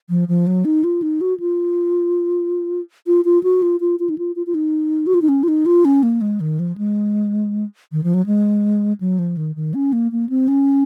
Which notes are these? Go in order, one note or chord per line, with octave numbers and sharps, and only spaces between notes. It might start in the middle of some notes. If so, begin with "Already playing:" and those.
F3
F3
F#3
D#4
F4
D#4
F#4
F4
F4
F4
F#4
F4
F4
F4
D#4
F4
F4
F4
D#4
F#4
F4
D#4
C#4
F4
D#4
F4
C#4
A#3
G#3
D#3
F3
G#3
D#3
F3
F#3
G#3
F#3
F3
D#3
D#3
C#4
A#3
A#3
C4
C#4